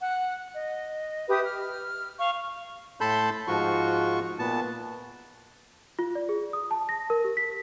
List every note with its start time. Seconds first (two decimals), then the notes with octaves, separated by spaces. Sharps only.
0.01 F#5
0.53 D#5
1.28 G4 B4 E5 D#6
1.44 F6
2.19 F5 C#6
3.01 A2 A4 A5 B5 C6 G6
3.48 G#2 F3 F4 F#4 C#6
4.39 A#2 B3 A5
5.99 F4
6.15 D5
6.29 G#4
6.53 D#6
6.71 A5
6.89 A#6
7.10 A#4
7.24 G4
7.37 B6